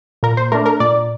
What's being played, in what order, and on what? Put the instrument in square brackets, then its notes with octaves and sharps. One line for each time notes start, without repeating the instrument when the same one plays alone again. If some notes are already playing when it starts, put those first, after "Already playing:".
[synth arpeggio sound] A#2 A#4
C5
A3 D4 A#4
A#4
A#2 D5